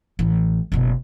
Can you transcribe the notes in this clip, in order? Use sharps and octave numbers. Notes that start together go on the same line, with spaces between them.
A1
F#1 B2